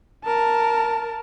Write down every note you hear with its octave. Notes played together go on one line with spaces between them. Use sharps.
A#4 A5